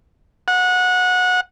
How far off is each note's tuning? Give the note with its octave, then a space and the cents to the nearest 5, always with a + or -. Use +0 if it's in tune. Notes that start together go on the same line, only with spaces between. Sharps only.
F#5 -20